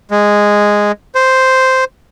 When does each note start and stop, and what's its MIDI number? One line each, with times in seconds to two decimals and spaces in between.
0.11 0.92 56
1.15 1.84 72